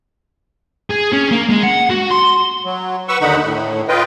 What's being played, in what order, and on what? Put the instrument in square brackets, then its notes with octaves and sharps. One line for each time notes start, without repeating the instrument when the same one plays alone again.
[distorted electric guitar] G#4
C#4
A#3
G#3
F#5
F#4
C6
[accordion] F#3
B4 F#5 C#6 E6
D#2 D3 D#4 F#5 B5
A2
F4 B4 D#5 G5